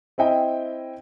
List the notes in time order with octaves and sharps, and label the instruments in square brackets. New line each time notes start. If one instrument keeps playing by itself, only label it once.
[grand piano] C4 E4 D#5 G5